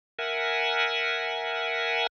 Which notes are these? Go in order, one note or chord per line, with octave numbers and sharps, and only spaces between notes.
A#4 E5 F#5 G#5